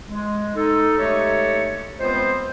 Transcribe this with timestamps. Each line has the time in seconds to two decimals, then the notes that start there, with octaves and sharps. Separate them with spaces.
0.07 G#3
0.56 D#4 A4
0.98 G#3 A3 D#4 G4 A4 C#5
1.99 G#3 B3 C4 F4 B4 C5